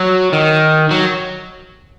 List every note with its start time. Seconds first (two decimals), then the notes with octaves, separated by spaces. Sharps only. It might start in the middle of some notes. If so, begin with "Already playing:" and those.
Already playing: F#3
0.32 D#3
0.91 F#3